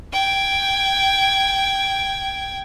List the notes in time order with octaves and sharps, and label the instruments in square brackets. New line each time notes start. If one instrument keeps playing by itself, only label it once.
[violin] G5 G#6